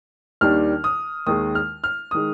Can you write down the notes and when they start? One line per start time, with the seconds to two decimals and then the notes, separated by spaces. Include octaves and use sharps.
0.41 D#2 D#3 G3 D4 F6
0.84 D#6
1.26 D#2 D#3 G#3 D#6
1.55 F6
1.84 F6
2.11 D#3 G#3 D#6